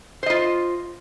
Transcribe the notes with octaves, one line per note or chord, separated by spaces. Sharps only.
F4 C5 D#5